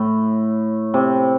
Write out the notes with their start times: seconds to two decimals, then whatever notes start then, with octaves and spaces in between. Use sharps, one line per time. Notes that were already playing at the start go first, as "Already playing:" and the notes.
Already playing: A2
0.94 C3